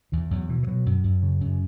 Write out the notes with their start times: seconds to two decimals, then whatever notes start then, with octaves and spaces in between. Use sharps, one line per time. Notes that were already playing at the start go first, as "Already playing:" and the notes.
0.12 E2 E3
0.31 E2 F#3
0.49 B2 E3
0.63 E3
0.67 B2 F#3
0.86 F#2
1.04 F#2
1.23 C#3
1.41 F#2